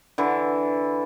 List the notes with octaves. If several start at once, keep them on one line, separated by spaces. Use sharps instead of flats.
D3 E3 A4